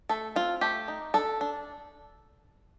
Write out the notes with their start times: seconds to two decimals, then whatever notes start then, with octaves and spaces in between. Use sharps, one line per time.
0.09 A3 A4
0.36 C4 F4
0.61 A3 G4
0.88 D#4
1.14 D4 A4
1.41 D4